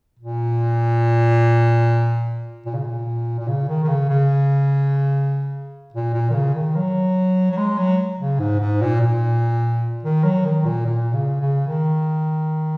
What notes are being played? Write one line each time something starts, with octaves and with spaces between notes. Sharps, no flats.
A#2
A#2
C#3
A#2
A#2
C#3
D#3
D#3
C#3
C#3
A#2
A#2
D#3
C#3
D#3
F#3
F#3
G#3
F#3
C#3
G#2
G#2
A#2
A#2
D#3
F#3
D#3
A#2
A#2
C#3
C#3
D#3